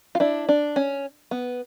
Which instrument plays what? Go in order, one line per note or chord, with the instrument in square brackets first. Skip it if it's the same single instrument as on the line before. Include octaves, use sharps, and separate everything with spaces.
[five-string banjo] F4
D4 E4
D4
C#4
B3